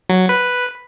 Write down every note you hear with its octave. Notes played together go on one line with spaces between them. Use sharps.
F#3
B4